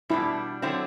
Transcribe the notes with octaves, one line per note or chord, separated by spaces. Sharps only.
B2 G3 D4 E4
D3 F#3 C4 E4